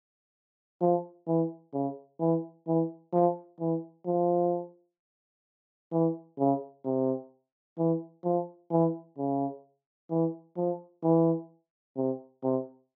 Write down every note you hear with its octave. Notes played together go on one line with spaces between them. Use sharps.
F3
E3
C#3
E3
E3
F3
E3
F3
E3
C#3
C3
E3
F3
E3
C#3
E3
F3
E3
C3
C3